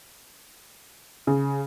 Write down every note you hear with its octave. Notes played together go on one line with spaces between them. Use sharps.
C#3